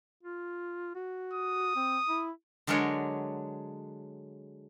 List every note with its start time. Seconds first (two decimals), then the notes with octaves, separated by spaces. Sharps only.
0.23 F4
0.95 F#4
1.33 D#6
1.76 C4
2.09 E4
2.67 D3 F#3 G#3 D4 A#4 C#5